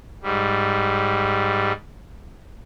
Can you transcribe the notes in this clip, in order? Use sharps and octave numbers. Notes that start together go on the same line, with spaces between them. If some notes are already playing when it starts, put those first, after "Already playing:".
G#2 G3